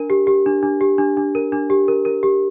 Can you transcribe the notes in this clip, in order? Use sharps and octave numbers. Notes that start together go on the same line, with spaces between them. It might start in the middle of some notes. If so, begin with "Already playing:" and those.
Already playing: D4 A#4
G4
G4
D4
D4
G4
D4
D4
A#4
D4
G4
A#4
A#4
G4